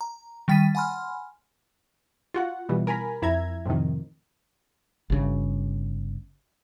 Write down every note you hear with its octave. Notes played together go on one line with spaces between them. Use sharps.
A#5
D#3 G3 G5 A6 B6 D#7
F#5 G#5 B5 C6 F6
F4 F#4 F#5
B2 E3 G3
A#4 G#5 A#5 B5
F2 E4 E5 A#5 G#6
F2 A2 C3 D#3
G1 C#3